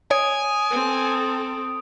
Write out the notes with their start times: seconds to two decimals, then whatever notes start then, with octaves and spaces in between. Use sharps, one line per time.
0.11 C#5 G#5 D#6 D7
0.71 C4 A4